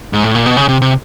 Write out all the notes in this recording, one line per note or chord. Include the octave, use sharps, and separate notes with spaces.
G#2
A2
A#2
B2
C#3
C3
C3